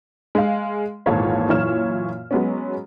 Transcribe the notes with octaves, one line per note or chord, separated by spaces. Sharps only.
G#3 F5
G#1 E2 A#2 A4 C#5 F5
F#2 A#2 E3 C#5 F6 E7
F#3 G#3 B3 C#4